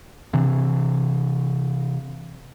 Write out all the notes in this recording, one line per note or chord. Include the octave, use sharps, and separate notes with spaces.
C3 E3